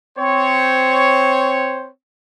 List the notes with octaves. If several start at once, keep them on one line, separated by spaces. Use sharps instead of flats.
C4 C5 C#5